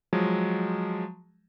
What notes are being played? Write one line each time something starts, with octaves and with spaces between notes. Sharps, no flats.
F3 F#3 G#3